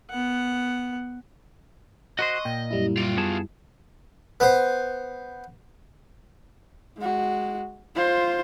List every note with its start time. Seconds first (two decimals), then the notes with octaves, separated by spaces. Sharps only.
0.10 B3 F#5
2.19 F#4 B4 C5 D#5 C6 C#6 F#6
2.45 A#2 G5
2.71 F#2 G3 E4
2.97 F4 G4
3.17 B3 G#4 A5
4.40 B3 C5
6.97 G#3 F#4
7.96 F4 C5